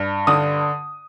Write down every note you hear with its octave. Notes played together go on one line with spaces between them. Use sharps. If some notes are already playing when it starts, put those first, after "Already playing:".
Already playing: G2
D3 D#6